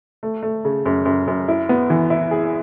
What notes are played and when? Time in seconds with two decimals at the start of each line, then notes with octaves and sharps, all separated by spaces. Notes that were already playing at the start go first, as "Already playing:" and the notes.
0.23 A3
0.43 A3
0.65 C#3
0.86 F#2
1.05 F#2
1.28 F#2
1.48 E4
1.69 B3
1.90 E3
2.10 E4
2.31 G#4